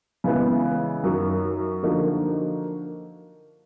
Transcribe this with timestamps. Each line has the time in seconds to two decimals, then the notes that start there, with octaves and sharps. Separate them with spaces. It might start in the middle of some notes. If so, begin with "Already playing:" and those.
0.24 C#3 E3 G#3 B3 E4
1.03 F#2 D#3 F#3
1.83 D3 F3 A#3 D#4 F#4